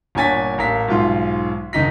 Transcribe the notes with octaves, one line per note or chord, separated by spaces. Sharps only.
G1 A#2 C#5 G#5 A6 B6
A1 A#4 F5 B6
B1 G#2 F4 C6
F#1 D#3 D#4 B6